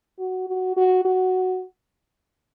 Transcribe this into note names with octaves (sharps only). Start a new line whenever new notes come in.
F#4
F#4
F#4
F#4